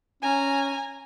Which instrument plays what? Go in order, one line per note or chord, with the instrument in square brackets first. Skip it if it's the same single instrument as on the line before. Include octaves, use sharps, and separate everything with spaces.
[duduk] C#4 [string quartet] G#5 A#5